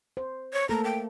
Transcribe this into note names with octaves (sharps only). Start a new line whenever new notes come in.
C5
C#5
A3 A#3 A4 A#5
G5